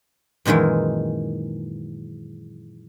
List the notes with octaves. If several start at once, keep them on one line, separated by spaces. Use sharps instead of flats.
F#2 A#2 D#3 E3 G#3